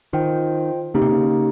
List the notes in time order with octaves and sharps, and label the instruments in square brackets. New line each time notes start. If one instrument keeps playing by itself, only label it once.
[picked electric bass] D#3 [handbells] F4 C5 D#5 G5
[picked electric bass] C#3 [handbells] A#3 D#4 G4
[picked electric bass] C3
C#3